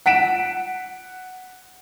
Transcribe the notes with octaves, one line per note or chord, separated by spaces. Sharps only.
F#5 B6 D7 E7